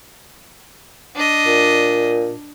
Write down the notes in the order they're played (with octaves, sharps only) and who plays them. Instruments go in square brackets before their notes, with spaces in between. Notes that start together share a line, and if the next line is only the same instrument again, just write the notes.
[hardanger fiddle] D4 D#5
[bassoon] A#2